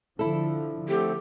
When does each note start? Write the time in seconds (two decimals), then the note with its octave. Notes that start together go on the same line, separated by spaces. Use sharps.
0.19 D3 F3 E4 A4
0.89 D3 A3 C4 G4